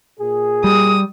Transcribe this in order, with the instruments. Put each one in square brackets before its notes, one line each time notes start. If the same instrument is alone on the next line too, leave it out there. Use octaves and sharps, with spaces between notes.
[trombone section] A#2 G#4
[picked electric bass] G3 [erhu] D#6